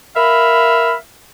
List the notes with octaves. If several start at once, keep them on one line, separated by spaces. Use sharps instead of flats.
A#4 E5 F5 B5